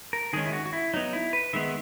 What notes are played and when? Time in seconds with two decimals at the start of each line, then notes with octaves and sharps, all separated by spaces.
0.13 A#4
0.33 D#3 G#3 C#4 G#4
0.45 E4
0.53 F#4
0.66 F#4
0.73 E4
0.93 F#3 B3 D#4
1.13 E4
1.33 B4
1.53 D#3 G#3 B3 E5